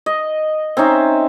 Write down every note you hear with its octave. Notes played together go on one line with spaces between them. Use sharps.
D#5
C4 C#4 D#4 E5